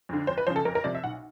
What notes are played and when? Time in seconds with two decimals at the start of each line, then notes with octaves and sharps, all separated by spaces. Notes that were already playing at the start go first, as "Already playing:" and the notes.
0.09 F2 D3
0.27 F2 C5
0.38 B4
0.47 C#3 F3 C5
0.56 A4
0.65 F2 A#4
0.75 A#4
0.84 C3 F3 D5
0.95 E5
1.04 B1 F#5